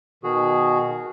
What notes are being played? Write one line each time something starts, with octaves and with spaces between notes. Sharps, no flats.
B2 D#3 F#4 G#4